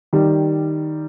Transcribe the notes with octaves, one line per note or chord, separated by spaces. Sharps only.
D#3 G3